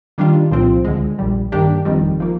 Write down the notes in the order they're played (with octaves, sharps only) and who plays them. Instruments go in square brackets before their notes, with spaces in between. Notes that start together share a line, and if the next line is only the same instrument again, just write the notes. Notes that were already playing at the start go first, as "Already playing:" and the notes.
[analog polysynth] D#3 G3 D4 F4
C2 A#2 F3 C4 F4
D2 D3 G#3
A#1 A#2 G3
G2 D#3 A#3 D4 G4
G1 F2 D#3 G3
F3 A#3